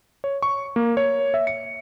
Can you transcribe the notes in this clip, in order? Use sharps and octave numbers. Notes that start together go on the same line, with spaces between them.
C#5
C#6
A#3
C#5
E5
C#7